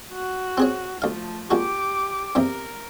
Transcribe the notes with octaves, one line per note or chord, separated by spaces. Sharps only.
F#4
C4 G#4 C#5
D2 F3 A3 F5
A#2 G#3 F#4 G4 D6
E2 G2 C3 A#4